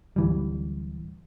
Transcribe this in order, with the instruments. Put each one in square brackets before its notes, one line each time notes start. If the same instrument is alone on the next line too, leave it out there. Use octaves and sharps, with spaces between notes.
[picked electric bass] D1 E3 G3